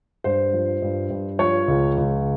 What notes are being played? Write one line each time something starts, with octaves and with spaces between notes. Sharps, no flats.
G2 C5
F3
G2
G2
F3 C#5
C#2
C#2